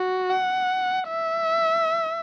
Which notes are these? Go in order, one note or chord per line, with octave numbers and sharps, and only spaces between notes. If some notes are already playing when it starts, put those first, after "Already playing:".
Already playing: F#4
F#5
E5